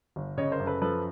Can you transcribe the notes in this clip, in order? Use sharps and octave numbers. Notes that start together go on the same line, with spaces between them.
G1
C#3 C#5 D#5
A#4 C5
F#2
A4 B4
F3 A4 B4